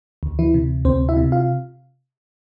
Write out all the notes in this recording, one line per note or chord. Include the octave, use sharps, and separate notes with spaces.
D2
E3 E4
C3
D2 C4 C5
E4 E5
C3
F4 F5